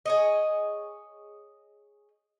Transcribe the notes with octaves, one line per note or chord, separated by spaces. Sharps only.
G#4 C#5 D#5